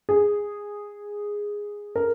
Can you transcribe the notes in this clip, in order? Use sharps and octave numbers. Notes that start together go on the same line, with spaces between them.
G#4
A#4